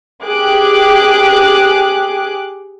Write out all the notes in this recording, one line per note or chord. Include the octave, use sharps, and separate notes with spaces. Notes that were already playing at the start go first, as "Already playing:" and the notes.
G4 G#4 D6 F#6